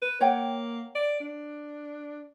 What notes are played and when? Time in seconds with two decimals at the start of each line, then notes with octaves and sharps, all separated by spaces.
0.02 B4
0.20 A#3 C#5 F#5 G5
0.95 D5
1.20 D4